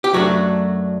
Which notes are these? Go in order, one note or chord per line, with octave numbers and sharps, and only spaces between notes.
G4
F#2 F#3 A3 D4 F#4